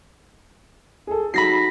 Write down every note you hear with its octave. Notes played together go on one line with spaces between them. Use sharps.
G#4 A4
F#3 D#4 F#4 B5 A#6 C7